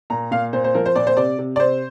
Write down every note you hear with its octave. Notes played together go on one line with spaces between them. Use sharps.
A#2 A#5
A#2 F5
A#2 C5
C5
F3 A#4
C5
A#2 D5
C5
C3 D5
C3
D5
C3 C5